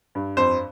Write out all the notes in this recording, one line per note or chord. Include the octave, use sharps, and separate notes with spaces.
G2
F2 C5